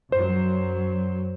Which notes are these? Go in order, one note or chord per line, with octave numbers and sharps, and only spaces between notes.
F#2 F#3 C5